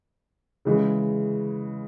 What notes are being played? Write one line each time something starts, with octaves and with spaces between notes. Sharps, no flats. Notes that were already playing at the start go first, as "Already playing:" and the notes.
C#3 E3 G#3